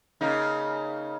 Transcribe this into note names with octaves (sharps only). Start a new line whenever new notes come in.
C#3 A#3 D#4